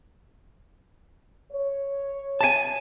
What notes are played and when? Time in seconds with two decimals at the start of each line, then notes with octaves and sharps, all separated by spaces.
1.52 C#5
2.41 G#5 A5